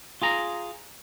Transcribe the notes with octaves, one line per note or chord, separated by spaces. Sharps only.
F4 G#4 A#5